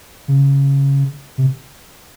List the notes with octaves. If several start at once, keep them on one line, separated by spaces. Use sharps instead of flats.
C#3
C3